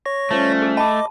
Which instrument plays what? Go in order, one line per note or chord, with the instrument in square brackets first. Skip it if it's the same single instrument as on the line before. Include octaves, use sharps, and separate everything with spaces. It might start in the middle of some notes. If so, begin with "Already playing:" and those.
[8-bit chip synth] C#5 C#6 A#6
[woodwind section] F3 G3 C#4 [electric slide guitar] A3
[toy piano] G#4
[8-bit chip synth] D#5 D6 [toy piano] A5 B5